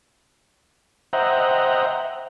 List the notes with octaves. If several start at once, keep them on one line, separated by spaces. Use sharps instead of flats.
C5 D#5 E5 F#5 G5 A#5